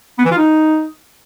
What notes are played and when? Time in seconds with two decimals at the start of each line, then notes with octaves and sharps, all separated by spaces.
0.18 B3
0.25 E3
0.31 F4
0.38 D#4